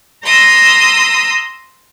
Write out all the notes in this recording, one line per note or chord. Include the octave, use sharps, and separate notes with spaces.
A#5 C6 D#6 E6